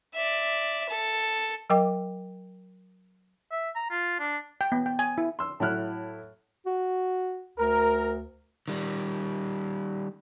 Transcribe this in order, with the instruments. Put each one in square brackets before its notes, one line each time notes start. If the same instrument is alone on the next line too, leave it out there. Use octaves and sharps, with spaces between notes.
[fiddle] D5 E5
A4
[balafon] F#3 A#4 D#5 G5 D6
[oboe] E5
A#5
F4
D4
[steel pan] G5
B3
G5
G#5
E4
[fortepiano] C6 E6
A2 F#3 E4 F6 F#6
[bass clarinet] F#4
[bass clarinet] D2 [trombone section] A#4
[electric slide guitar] D#3 G3